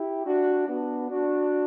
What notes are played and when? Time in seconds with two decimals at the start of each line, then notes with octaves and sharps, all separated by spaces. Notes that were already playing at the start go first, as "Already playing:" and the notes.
Already playing: E4 G4
0.25 D4 F#4
0.67 B3 D4
1.09 D4 F#4